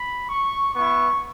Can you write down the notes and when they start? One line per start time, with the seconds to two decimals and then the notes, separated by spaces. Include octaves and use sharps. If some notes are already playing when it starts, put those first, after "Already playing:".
Already playing: B5
0.30 C#6
0.75 B3 E4 C#6